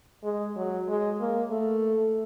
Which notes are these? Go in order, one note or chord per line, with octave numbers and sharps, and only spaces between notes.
G#3
F#3
G#3
A#3
A3